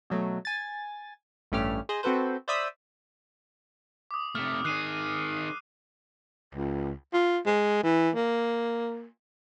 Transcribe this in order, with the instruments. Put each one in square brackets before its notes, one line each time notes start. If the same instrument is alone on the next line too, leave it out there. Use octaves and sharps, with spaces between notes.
[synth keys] B2 F#3 A3
G#5 A6
A1 G2 A3 C#4 G4 F6
G#4 C5 D#5
C4 F#4 A4 B4 C5
C5 D5 E5 B5 D#6 E6
[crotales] D6 D#6
[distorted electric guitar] C3 A3 [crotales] F6
[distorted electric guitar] D#3 G#4 [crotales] F#6 C7 D#7
[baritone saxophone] C#2
F4
G#3
E3
A#3